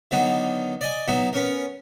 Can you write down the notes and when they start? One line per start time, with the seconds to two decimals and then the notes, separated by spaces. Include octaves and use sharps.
0.11 D3 D#3 F#3 B3 D#4
0.81 D5 D#5 G#5
1.08 F#3 B3 D#4 E4
1.33 B3 C#4 A#4